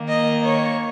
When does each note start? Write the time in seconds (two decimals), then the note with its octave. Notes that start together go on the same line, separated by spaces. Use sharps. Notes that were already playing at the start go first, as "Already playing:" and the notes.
Already playing: D#3 A#3
0.08 D#5
0.44 C#5